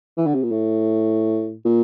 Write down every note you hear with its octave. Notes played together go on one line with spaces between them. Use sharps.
E3
D3
C3
A#2
A2
A#2